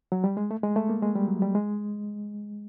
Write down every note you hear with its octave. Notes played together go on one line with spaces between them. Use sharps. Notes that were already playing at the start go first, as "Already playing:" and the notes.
F#3
G3
G#3
A3
G#3
A3
A#3
G#3
G3
F#3
G3
G#3